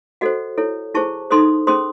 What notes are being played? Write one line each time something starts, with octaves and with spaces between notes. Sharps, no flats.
F#4 A4 C5 D#5 F#5
E4 A4 C#5
E4 G#4 C5 A5 C#6
D#4 A4 C5 C6 D#6
C#4 G#4 C5 C6 D#6